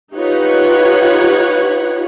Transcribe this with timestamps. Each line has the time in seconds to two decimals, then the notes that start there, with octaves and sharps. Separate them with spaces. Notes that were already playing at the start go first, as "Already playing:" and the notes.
0.13 D#4 F4 G4 B4 C#5 F#5